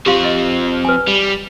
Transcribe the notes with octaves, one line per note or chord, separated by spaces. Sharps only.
F3 C4 G4 F5 C6
D#5
B4 G#5
G3